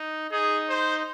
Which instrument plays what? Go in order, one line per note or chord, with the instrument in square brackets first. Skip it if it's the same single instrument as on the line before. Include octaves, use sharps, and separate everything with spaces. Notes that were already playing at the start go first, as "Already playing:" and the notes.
Already playing: [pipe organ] D#4
[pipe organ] D#4 [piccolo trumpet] G#4
[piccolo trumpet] C5